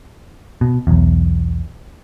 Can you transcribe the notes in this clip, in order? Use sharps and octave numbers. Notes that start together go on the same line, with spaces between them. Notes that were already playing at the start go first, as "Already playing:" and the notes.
B2
B1 E2